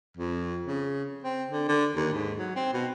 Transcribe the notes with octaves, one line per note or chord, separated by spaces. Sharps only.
F2
C#3
C4
D3
D3
D#2
G#2
F#3
C4
B2